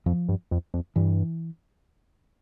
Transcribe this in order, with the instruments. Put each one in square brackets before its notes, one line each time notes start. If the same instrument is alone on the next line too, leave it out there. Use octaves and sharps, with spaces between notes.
[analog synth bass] F2 [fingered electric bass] F3
[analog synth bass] G2
F2
F2
[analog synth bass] G2 [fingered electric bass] E3